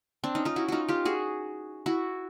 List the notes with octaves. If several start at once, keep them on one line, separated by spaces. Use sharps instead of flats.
C4 D4
C#4 D#4
D#4 F4
E4 F#4
D#4 F4 F#4
F4 G4
F#4 G#4
E4 F#4